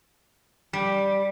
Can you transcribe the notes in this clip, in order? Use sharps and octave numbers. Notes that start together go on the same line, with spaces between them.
G3